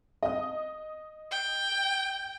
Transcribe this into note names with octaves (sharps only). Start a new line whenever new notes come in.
D#5 D#6
G5